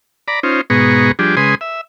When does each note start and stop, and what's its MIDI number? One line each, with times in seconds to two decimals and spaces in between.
0.28 0.40 74
0.28 0.40 82
0.28 0.40 83
0.43 0.61 61
0.43 0.61 63
0.43 0.61 65
0.43 0.61 72
0.70 1.12 44
0.70 1.12 47
0.70 1.12 59
0.70 1.12 68
0.70 1.12 82
0.70 1.12 85
1.19 1.35 53
1.19 1.35 55
1.19 1.35 62
1.19 1.35 67
1.19 1.35 68
1.37 1.55 49
1.37 1.55 56
1.37 1.55 71
1.37 1.55 80
1.37 1.55 84
1.37 1.55 87
1.61 1.81 76